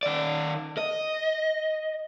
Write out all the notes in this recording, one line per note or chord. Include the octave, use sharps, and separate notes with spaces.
D#3 D5
D#5